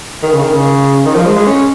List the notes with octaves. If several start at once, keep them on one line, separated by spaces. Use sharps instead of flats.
D#3
C#3
D#3
C#3
D#3
F3
G#3
G#3
C#4